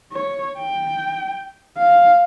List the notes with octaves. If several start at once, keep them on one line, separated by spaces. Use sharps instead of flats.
C#5
G5
F5